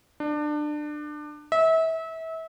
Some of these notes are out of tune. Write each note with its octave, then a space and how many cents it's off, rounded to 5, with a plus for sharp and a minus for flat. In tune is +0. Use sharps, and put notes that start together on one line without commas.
D4 +25
E5 -30